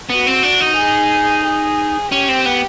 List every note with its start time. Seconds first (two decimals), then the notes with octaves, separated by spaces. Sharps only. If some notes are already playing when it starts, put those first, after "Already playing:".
0.09 B3 F#4
0.27 C4
0.43 D4
0.61 D#4
0.77 G#4
1.44 G#4
2.12 C#4 G4
2.29 C4
2.45 B3